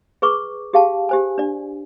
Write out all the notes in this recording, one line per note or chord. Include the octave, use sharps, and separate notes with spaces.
G#4 B4 C#6 D6
G4 G#4 F5 G5 A5
G4 C5 G#5
D4 D5